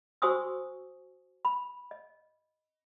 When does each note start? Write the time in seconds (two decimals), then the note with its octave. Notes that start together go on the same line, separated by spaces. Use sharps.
0.22 F#4 C5 G#5 C#6 D#6 E6
1.45 B5
1.91 D#5